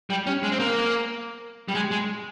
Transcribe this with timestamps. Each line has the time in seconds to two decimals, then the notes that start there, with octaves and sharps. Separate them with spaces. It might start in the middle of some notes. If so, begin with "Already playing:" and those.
0.10 G3
0.27 C#4
0.43 G#3
0.52 C4
0.60 A#3
1.68 G3
1.75 G#3
1.91 G#3